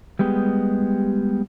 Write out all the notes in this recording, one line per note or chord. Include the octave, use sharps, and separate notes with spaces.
G3 G#3 B3 G4